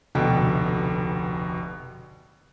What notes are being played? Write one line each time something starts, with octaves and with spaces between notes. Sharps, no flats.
F1 D2 B2 A4 G5